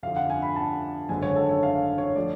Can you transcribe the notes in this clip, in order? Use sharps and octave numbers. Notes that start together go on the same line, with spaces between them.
F2 D3 F3 F5
F#5
G#5
B5
A5
G#1 F#2 D3 G#3 G#5
C#5
A4
C#5
F5
C#5
F3 A3 D5